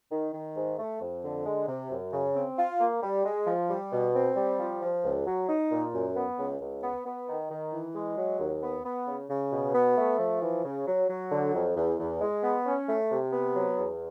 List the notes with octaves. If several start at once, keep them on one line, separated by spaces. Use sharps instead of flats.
D#3
D#3
G#2
A3
F2
D3
G#3
C3
F#2
C#3
C4
F4
A#3
G3
G#3
F3
G3
B2
C4
G3
F3
F3
C#2
F#3
D#4
A#2
F#2
B3
C#2
C#2
B3
B3
D#3
D#3
E3
G#3
F#3
D#2
B3
B3
C#3
C#3
B2
B3
A3
F3
E3
C#3
F#3
F#3
D3
F2
E2
E2
G#3
B3
C#4
A3
C3
B3
F#3
E2